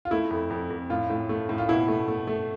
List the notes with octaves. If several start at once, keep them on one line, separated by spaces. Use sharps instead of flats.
F4
A3 E4
F2
F2
F2
A2 F4
A2
A3
A2
F4
B2 E4
A3
A3
A3